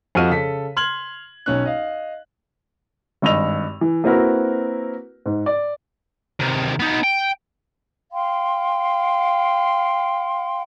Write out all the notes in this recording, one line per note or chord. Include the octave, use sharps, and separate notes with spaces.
F2 F3 F#4 D#5 F6 D#7
C#3 A4 B6
C6 F6 G#6 F#7
B1 C#4 F#6
D#5 F5
G#1 G2 D#5 E6 F7
E3
A#3 C4 E4 F#4 A#4 B4
G#2
D5
C3 D#3
B3 D#4
G5
F5 G5 C6